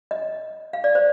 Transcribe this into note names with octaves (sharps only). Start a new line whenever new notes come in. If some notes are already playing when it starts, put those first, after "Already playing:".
D#5
F5
D5
C5